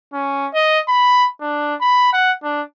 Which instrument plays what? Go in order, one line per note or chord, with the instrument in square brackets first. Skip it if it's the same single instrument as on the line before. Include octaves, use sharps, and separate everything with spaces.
[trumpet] C#4
D#5
B5
D4
B5
F#5
D4